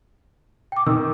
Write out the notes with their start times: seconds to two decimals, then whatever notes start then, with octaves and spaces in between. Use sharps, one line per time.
0.72 G5 D6
0.86 D#3 E6